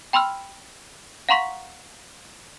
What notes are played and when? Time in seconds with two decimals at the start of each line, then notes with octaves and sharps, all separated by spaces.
0.13 G5 B5 C6 E6 F6
1.29 F5 F#5 A#5 C6 C#6 B6